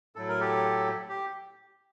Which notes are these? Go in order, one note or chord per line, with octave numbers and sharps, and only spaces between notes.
A2 F#3 A4
A#4
G4 A4
G4